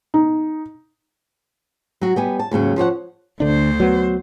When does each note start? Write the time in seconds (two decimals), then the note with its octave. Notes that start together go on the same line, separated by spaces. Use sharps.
0.14 D#4
2.01 F#3 F#4
2.16 G3 B3 G#5
2.39 A5
2.51 D#2 G#2 C#3 F#3
2.76 F3 C5 C#5 F#5
3.40 D2 D3 D4 C5
3.80 F#3 B3